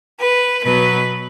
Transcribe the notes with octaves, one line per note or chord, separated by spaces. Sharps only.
B4
B2 F#3 B4